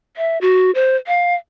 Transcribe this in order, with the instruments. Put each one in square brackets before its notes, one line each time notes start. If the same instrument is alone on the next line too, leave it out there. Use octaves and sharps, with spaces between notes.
[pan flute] E5
F#4
C5
F5